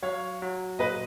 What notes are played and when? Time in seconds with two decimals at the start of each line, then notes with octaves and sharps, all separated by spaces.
0.02 F#3 C#5 F5
0.42 F#3
0.79 A#2 B4 D#5